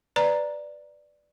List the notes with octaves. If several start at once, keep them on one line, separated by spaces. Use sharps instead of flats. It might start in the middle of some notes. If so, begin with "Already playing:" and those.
B4 D5 A#5